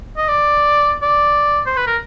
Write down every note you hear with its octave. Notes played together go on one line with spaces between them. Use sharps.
D#5
D5
D5
C5
B4
A#4